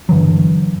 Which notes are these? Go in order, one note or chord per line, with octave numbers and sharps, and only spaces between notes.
G2 D3 E3 F#3